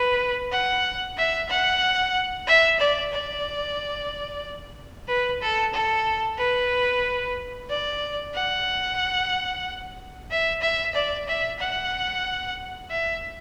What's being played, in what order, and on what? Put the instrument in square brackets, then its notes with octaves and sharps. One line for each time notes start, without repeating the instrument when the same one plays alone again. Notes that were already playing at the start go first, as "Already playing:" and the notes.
Already playing: [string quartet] B4
F#5
E5
F#5
E5
D5
D5
B4
A4
A4
B4
D5
F#5
E5
E5
D5
E5
F#5
E5